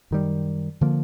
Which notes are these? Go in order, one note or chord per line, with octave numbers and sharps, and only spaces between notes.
F#2 D#3 G3
D3 F3 A#3